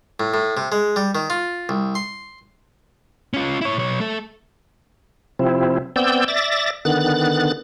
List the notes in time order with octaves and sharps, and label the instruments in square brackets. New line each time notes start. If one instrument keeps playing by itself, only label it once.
[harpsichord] A2
A2
C3
G#3
G3
D#3
F4
C2
C6
[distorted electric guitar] C#4 F4
E4 C#5
B1 C#5
A3 A4
[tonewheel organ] C3 F3 C4 E4
B3 C4 D5 E6 G6
D5 E5 A6 A#6
D3 D#3 B3 F#6 A6